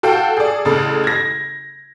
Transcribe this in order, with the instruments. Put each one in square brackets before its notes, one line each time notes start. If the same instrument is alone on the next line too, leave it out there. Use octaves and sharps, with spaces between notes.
[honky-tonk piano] F#4 A4 F5 G5
G#4 A4 D5
A1 C#3 A4
G#6 A#6